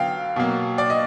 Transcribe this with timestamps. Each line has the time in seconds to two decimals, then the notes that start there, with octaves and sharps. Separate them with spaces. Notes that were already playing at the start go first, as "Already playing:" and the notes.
Already playing: D3 F#3 B3 F5 G5
0.36 B2 F#3 A#3
0.78 D5
0.90 D#5